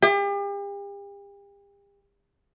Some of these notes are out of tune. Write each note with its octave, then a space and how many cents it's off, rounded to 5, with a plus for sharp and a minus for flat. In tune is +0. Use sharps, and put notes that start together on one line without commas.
G4 +40